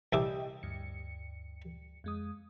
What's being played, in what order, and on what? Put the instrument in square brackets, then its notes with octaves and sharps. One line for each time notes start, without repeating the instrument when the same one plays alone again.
[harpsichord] C2 E4 D6 [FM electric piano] D5 D#5 G5
[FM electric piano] D2 G2 C#7
F2 G#3 D#6